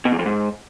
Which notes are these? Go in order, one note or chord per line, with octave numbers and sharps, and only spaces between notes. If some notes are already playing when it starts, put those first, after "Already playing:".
B2
E2
F2
G#2